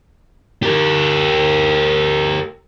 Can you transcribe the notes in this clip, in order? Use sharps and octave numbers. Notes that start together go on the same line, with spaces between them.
G4 A#4